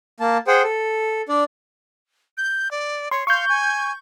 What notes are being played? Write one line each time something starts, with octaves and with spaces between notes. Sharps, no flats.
A#3 A5
G#4 C5 F#5 G5
A4
D4 D5
G6
D5
C#5 C6
F5 C#6 G6
G#5